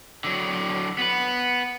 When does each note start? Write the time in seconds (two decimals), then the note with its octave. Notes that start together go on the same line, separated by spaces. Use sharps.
0.24 D3 F#3
0.98 B3 B4